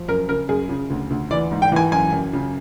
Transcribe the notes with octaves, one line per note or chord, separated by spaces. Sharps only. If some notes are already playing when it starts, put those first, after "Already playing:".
Already playing: F3
F#2 A#4
C#3 A#4
F#2 G#4
C#3
D2
D2
E3 D5
G#2
G5
E3 G#5
F#2 G#5
F#2
C#3